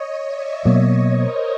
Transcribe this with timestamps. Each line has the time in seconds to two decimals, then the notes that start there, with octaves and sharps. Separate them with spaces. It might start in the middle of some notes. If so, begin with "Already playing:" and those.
Already playing: C#5 D#5
0.22 D5 E5
0.65 B2 F#3 A#3 C#5 D#5
1.08 A#4 C5